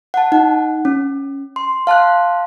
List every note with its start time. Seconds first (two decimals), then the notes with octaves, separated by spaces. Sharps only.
0.14 F#5 A5
0.32 D#4 F#5
0.85 C#4
1.56 C6
1.87 F5 A5 C6 F#6